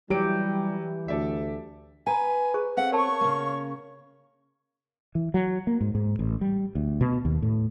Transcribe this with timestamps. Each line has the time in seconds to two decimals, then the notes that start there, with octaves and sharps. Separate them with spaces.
0.10 E3 F#3 G3 G4 D7
1.08 D2 A4 D5 E5
2.07 B4 G5 G#5 A#5
2.54 G#4 C5 C#6
2.77 C4 A4 F5 F#5
2.92 A#4 C#5 A5 C6 C#6
3.21 C#3 A#3
5.15 E3
5.34 F#3
5.67 A#3
5.81 G#2
5.95 G#2
6.19 A1
6.41 G3
6.75 D2
7.01 B2
7.25 D#2
7.42 A2